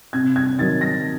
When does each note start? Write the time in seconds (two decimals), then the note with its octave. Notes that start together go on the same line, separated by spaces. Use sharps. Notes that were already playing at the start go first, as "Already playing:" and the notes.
0.13 C3 G#6
0.36 G#6
0.59 D#3 F#3 A6
0.81 A#6